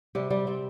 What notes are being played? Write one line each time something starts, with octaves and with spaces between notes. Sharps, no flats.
C3 G3 G4
G3 G4
G3 C4